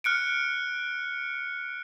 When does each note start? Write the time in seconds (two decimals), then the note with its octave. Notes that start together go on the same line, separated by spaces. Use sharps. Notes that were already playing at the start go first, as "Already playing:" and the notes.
0.04 F6 F#6 C#7 D7